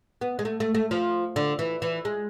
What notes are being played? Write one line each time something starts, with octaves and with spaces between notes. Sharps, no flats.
B3
G#3
A3
A3
A3
F3
D3
E3
E3
G#3